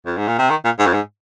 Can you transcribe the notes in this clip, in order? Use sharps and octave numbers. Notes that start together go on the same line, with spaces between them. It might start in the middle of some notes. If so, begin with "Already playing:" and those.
F2
G#2
A#2
C3
D#3
A#2
G#2
F2
G#2